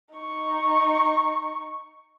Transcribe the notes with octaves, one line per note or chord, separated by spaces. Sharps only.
D#4 C#6